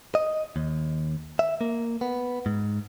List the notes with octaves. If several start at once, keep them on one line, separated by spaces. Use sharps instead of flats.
D#5
D#2
E5
A#3
B3
G#2